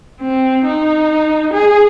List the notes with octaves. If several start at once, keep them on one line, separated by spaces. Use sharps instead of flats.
C4
D#4
G#4